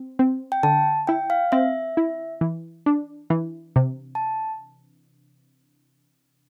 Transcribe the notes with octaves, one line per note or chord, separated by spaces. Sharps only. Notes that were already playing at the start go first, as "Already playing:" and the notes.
Already playing: C4
C4
G5
D3 A5
E4 G5
F5
C4 E5
E4
E3
D4
E3
C3
A5